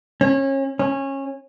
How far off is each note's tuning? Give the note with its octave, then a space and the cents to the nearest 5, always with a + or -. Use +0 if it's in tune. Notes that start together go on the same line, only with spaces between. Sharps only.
C#4 -30
C#4 -20